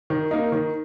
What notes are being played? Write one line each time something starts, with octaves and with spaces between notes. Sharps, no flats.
D#3
A#3 D#4
D#3